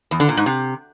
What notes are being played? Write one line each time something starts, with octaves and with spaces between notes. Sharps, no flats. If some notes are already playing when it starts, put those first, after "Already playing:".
E2
D3
A#2
G#2
C3